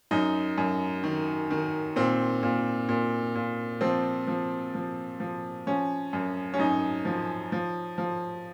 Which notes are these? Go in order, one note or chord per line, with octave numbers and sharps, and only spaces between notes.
F#2 D#4
F#2
D#3
D#3
A#2 C4
A#2
A#2
A#2
F3 C4
F3
F3
F3
F3 C#4
F#2
C#4
F#2 D#4
F3
F3
F3